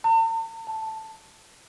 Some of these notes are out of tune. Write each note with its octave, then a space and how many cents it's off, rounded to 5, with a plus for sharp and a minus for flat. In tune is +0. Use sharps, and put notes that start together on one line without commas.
A5 +45
A5 +0